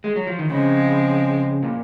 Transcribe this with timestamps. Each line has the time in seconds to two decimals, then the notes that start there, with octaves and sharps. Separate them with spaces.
0.04 G#3
0.16 F#3
0.27 F3
0.39 D#3
0.50 C#3 F3 G#3 C4
1.62 A#2